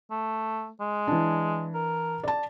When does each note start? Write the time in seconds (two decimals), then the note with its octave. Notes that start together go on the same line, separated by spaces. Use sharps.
0.11 A3
0.81 G#3
1.08 E3 D4
1.74 A#4
2.23 D5 A5